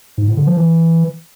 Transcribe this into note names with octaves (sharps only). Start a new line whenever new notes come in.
G#2
A2
D3
F3
E3